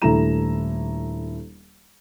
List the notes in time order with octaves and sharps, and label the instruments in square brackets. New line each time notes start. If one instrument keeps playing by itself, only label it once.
[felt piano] D#1 A3 D4 E4 A#5 E7